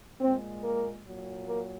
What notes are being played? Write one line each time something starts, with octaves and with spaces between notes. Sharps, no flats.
A#2 G#3 C4
A#3
A#2 F#3
A#3